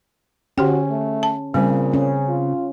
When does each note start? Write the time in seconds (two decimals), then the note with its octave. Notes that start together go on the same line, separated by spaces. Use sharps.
0.58 D3 C#4 F#4 G4 G5
0.90 A3
1.23 A5
1.54 A#2 C#3 G3 C4
1.94 C#4
2.28 F4